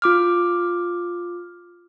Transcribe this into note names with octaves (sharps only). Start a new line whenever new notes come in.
F4 D6 F6